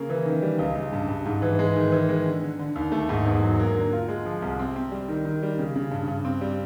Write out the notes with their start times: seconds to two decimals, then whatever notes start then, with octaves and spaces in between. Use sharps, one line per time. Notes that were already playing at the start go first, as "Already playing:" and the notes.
Already playing: C#3 A#3
0.10 E3
0.25 D#3
0.42 G3
0.59 C#2
0.75 C#2
0.92 G2
1.09 G2
1.25 G#2
1.42 E3
1.59 G#3
1.76 D#3
1.92 E3
2.09 G#3
2.26 D3
2.42 D3
2.59 D3
2.76 D#2
2.92 A3
3.09 G#2
3.25 E2
3.43 F#3
3.59 A#3
3.75 D3
3.92 F4
4.08 G#3
4.25 F3
4.42 C2
4.59 C4
4.76 C4
4.91 G3
5.08 D#3
5.25 D#3
5.43 G3
5.58 C#3
5.76 C#3
5.92 G2
6.08 G2
6.25 C4
6.41 G3